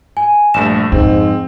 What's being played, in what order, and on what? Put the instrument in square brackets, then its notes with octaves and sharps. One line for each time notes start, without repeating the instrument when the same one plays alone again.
[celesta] G#5
[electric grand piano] A#1 G2 A3 [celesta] E7
[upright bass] F2 [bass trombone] G#2 [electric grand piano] C4